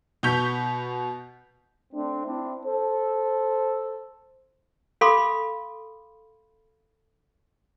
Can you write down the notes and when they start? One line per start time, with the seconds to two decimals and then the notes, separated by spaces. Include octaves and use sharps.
0.23 B2 B3 C#6 G6 B6 F7
1.93 A3 C4 D4
2.26 C4 D4 E4
2.65 A4 C5
5.01 A4 F5 B5 C6 D6